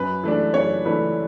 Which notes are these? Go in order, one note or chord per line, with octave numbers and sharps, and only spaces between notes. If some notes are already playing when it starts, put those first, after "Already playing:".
Already playing: F#2 B4
E3 A3 D4
F#2 C#5
E3 A3 D4 B4